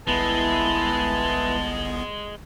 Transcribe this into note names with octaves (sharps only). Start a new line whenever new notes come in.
G1 C2 G#3 B3 E4 B4 A5